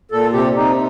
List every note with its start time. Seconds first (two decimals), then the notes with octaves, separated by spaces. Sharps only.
0.11 A#2 A4
0.33 C3 G4
0.55 C3 D#4